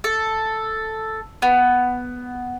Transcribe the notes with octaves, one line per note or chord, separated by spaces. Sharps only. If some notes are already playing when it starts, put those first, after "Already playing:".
A4
B3